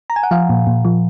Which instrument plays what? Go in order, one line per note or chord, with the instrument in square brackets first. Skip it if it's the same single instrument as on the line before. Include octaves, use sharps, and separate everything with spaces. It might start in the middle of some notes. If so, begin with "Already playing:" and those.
[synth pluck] A#5
G#5
F#5
F3 F5
A#2
A#2
F3